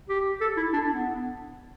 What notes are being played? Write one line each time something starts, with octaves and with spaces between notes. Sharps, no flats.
G4
A4
E4
D4
B3